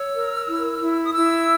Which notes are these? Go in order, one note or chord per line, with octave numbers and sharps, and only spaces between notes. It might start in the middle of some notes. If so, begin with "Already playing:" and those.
Already playing: C#5 E6
A#4
E4
E4
D#6
E4 E6